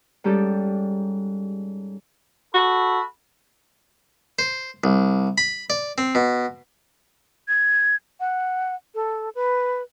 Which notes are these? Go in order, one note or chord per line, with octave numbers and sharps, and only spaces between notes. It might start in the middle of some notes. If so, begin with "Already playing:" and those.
G#2 G3 C#4 G4 A4
F#4 A4 B5
C5
C2
B5
D5
C4
B2
G#6
F#5
A4
B4